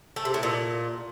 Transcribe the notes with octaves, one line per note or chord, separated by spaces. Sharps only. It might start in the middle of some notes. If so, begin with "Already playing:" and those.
A3
C3
A2
A#2